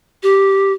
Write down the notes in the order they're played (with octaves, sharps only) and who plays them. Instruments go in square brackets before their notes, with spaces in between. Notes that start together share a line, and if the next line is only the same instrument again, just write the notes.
[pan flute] G4